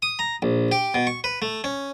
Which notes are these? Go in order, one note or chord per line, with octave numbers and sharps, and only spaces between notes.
D#6
A#5
A#1
G4
B2
C#6
B4
A3
C#4